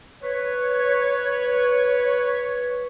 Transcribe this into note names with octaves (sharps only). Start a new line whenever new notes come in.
B4 C#5